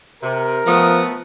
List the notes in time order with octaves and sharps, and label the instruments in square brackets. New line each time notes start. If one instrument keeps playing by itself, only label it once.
[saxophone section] C3 [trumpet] A#4
[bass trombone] F3 [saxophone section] A3 B3 [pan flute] D#6